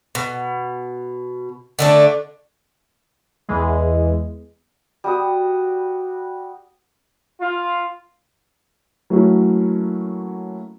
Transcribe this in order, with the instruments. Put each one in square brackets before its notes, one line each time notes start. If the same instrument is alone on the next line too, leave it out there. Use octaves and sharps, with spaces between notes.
[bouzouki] B2
D3 A3 D4
[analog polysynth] E2 E3 G#3
[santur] G3 F#4 D#6
[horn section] F4
[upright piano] F#3 A3 A#3 C#4 E4 F#4